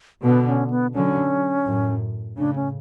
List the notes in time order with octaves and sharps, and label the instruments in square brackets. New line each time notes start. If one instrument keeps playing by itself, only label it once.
[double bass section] B2 D3 [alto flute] B3
[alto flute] C#4
B3
[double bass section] D3 F#3 [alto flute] C#4
[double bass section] F#2 A2
[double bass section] A2 C#3 [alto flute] D4
[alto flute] C#4